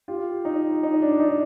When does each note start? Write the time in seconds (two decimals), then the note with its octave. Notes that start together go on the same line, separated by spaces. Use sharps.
0.08 F4 G4
0.45 D#4
0.83 D#4
1.02 D4
1.20 D#4